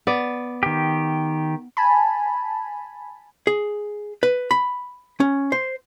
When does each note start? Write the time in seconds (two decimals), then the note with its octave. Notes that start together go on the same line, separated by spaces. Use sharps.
0.07 B3 D5
0.63 D#3 G4
1.77 G#5 A5 B5
3.47 G#4
4.23 B4
4.51 B5
5.20 C#4
5.52 C5